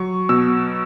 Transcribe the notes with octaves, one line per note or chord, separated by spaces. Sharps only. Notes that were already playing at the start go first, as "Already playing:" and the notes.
Already playing: F#3 C#6
B2 E6